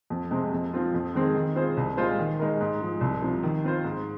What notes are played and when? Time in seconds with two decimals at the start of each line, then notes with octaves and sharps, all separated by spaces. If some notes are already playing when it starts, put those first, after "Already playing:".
0.10 F2
0.31 C3 G#3 C4
0.53 F2
0.73 F3 C4 F4
0.94 F2
1.15 D#3 G#3 C4 G#4
1.35 D#3
1.55 C4 F4 G#4 C5
1.77 C2
1.97 A#2 G#3 F4 C5
2.19 D#3
2.40 G#3 D#4 A#4
2.61 G#2
2.81 F3 G#3
3.01 C2
3.22 C3 F3
3.43 D#3
3.64 C4 F4 C5
3.84 G#2